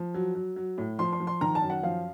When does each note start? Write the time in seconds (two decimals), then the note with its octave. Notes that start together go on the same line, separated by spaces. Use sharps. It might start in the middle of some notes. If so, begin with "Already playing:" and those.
Already playing: F3
0.14 F#3
0.35 F#3
0.56 F#3
0.78 A2
0.99 F3 C6
1.12 C6
1.20 F3
1.27 C6
1.41 D#3 A#5
1.55 A5
1.62 F#2
1.70 F#5
1.83 F3 F5